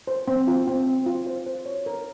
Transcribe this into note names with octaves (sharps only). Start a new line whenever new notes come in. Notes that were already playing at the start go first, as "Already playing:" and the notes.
C5
C4
F4
C4
C4
F4
C5
C5
C#5
A#4